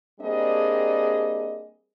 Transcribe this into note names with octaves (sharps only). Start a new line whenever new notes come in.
G3 A#3 C4 D4 G#4 D#5